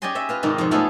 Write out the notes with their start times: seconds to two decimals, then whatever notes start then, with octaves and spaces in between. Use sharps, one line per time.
0.02 C#4 G4 D5 D#5 G#5 C6
0.15 C#5 D#5 E5
0.29 F4 B4 F5
0.43 G#2 C3 D#3 C4 D5
0.58 F2 B2 F3
0.71 F3 A3 B3 C#4 G#4 A4